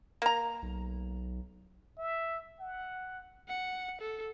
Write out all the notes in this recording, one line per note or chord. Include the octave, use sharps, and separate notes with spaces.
A#3 A#5
B1
E5
F#5
F#5
A4